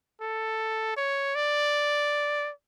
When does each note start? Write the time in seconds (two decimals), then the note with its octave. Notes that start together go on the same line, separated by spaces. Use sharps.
0.21 A4
0.97 C#5
1.35 D5